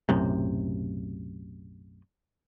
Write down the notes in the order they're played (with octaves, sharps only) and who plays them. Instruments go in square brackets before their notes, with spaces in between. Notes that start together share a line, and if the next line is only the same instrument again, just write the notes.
[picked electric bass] B1 F#2 A2 C3